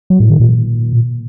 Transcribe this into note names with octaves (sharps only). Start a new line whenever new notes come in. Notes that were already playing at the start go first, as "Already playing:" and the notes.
F#3
A2
D#3
A#2